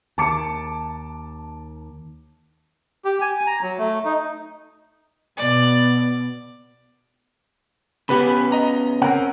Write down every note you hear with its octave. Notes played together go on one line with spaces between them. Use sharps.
D#2 A5 D6 C#7
G4
G#5
A#5
F#3
A3
D#4
B2 B3 D5
C#3 B3 C#4 G4 B4 B5
D#5 A#5
C4 C#4 A#4 F#5